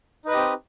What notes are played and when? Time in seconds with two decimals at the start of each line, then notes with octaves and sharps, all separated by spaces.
0.25 D#4
0.28 B4
0.31 D#5
0.34 G4
0.37 C4